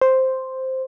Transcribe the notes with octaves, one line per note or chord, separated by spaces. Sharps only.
C5